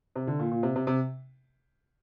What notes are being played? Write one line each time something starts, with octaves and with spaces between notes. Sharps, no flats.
C3
D3
A#2
A#2
C3
C3
C3